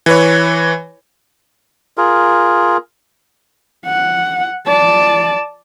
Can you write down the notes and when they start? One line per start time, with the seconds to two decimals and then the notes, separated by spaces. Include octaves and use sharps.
0.06 E3 B4 C#5
1.97 F4 G#4 A#4
3.86 F#5
4.67 D5 A5